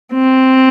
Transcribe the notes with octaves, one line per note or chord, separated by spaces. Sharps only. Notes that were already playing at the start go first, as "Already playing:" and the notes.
C4